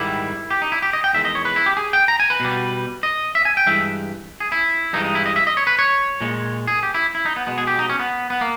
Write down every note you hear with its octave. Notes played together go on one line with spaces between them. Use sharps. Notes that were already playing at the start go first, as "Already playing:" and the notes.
Already playing: G#2 D#3 G3 E4
G4
D#4
E4
G4
D#5
G5
E2 D#3 G#3 E5
D#5
C#5
B4
E4
G4
G#4
G5
A#5
G#5
B4
B2 G3
D#5
E5
G#5
G5
G2 E3 G#3 E5
G#4
E4
G2 E3 G#3 D#4
D#4
E4
D#5
E5
D#5
C#5
B4
C#5
A#2 G#3
G#4
G4
E4
E4
D#4
B3
B2 G#3 B3
G#4
G4
D#4
C#4
B3
B3
A#3